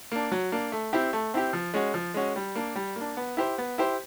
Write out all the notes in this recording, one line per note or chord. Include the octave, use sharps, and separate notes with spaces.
A#3 D4
F#3
A#3 D4
A3
C4 E4 G4
A3
C4 E4 G4
F3
G#3 C#4 F#4
F3
G#3 C#4 F#4
G3
A#3 D4
G3
A#3 D4
B3
E4 G4 C5
B3
E4 G4 C5